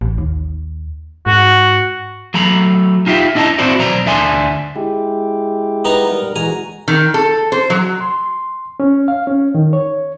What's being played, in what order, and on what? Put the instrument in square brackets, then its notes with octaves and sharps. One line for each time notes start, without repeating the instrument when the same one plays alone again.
[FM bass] A1
D#2
[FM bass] G#2 [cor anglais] F#4
[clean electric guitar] F#3 A3 A#5 B5
D#4 F4 G4 E5
D4 E4 D#5 G5 A5 A#5
C4 E4 F#4 C5 D5
B1 C5 D5 A#5
D2 D4 E5 G#5 C6
[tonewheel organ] G#3 E4 G4
[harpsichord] B3 D#4 A#5
[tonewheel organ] G3 A#4
[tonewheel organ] E3 G#3 F#4 [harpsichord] G#5 A#5
[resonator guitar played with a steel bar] D#3
A4
C5
F#3
[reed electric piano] C6
C#4
F5
C#4
D#3
C#5